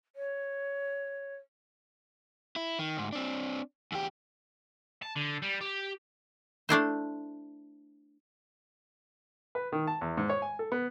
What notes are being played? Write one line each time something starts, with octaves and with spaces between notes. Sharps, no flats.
C#5
E4
D#3
D2 G#2
C4 D4
E2 G4
A5
D3
G3
G4
A3 D4 E4 C5
B4
D#3
A5
E2
G#2
C#5
G#5
A4
B3